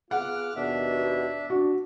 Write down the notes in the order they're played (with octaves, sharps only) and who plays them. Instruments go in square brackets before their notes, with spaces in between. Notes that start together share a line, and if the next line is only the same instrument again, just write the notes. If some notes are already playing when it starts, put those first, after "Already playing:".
[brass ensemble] B3 F4 G#4 [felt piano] F#5 [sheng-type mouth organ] D6 F6 F#6
[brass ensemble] D#2 B2 [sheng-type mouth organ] D4 E5
[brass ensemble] D4 [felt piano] F#4